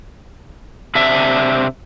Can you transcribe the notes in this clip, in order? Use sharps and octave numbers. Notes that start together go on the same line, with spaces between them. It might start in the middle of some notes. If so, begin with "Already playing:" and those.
C3 D4 E5